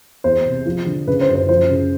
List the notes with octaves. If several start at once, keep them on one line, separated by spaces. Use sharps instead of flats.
E2 C5
C3
F3
D3
C#3 B4
C5
F#2
C5
F3 C5
C#3